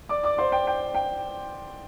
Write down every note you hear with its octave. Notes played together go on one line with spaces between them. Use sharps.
D5 D6
D5 D6
C5 C6
G5
G5
G5